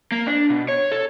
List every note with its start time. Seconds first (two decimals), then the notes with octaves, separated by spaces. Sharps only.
0.12 A#3
0.27 D4
0.50 B2
0.68 C#5
0.92 A4